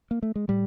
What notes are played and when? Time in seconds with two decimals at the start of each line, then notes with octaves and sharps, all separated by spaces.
0.11 A#3
0.23 A3
0.36 G#3
0.48 A2 G3